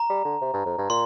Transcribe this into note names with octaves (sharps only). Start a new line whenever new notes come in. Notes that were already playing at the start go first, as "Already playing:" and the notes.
Already playing: A#5
G3
D3
C3
G2
F2
G2
A#2 C6